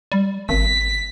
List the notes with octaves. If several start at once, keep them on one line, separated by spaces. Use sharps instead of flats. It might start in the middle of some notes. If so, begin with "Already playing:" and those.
G3
G#1 B6